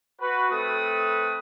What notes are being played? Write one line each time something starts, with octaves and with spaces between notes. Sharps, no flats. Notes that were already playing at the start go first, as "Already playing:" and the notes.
F#4 B4
A3 C4 A4 B4 D#6